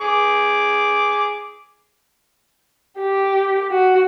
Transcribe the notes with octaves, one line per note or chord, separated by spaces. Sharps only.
G#4 D6
G4
F#4